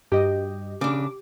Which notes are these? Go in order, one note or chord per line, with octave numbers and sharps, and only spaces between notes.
G2 G4 D#5
C#3 D4 D6